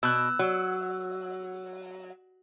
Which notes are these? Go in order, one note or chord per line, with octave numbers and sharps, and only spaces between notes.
B2 E6 F#6
F#3